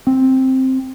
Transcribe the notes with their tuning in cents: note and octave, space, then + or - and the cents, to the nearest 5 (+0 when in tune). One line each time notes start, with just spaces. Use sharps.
C4 +5